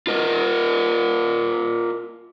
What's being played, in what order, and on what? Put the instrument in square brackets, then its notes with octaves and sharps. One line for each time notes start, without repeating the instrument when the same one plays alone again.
[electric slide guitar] F4 A#4 D#5